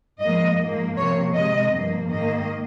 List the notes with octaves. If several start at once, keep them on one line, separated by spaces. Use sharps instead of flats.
G#2 F3 A#3 D#5
G#2 F3 A#3
C3 F3 A#3 C#5
C3 D#3 G#3 D#5
G2 F3 A#3
G#2 D#3 A#3 D#5